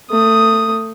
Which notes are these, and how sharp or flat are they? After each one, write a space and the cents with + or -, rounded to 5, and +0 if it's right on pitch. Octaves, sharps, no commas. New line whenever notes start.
A3 +25 D#6 +0